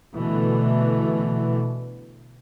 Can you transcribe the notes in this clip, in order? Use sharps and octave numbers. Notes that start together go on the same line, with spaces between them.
B2 D3 E3 A3